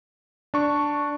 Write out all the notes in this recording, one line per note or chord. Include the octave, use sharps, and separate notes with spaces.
D4 C#6